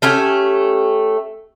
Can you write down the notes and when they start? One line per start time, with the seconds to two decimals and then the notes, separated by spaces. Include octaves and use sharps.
0.02 A3 C#4 G4 G#5